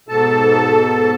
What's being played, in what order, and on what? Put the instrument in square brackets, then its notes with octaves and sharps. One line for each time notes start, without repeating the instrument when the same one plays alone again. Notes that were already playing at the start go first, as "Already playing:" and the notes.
[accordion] G#2 B2 A4 A5